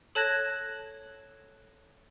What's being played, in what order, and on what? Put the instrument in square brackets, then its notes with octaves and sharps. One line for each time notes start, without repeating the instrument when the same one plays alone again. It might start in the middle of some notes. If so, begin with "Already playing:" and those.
[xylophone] A4 C#5 A5 F#6 G#6 A#6